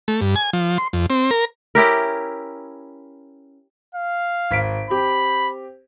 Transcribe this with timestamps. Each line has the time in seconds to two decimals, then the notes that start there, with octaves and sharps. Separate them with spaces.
0.08 A3
0.21 G2
0.36 G#5
0.53 F3
0.78 C6
0.93 F2
1.10 C4
1.31 A#4
1.75 C#4 E4 G4 A#4
3.95 F5
4.51 G#1 B6 D7
4.90 C4 G4 B5